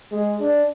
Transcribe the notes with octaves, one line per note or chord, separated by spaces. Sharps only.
G#3
D4